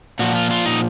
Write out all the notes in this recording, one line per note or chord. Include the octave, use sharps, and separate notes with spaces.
A#2 F3 F#4
F4
F4
D#4